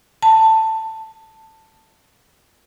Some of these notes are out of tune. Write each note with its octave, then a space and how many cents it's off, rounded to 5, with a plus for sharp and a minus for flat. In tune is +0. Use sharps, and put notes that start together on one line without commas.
A5 +10